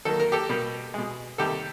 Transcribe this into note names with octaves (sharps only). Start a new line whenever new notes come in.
D#3 F#3 A#3 A4
A#4
G4 A4
B2 G3 A#3
B2 G#3
C3 D#3 G3 A#3 G4 A4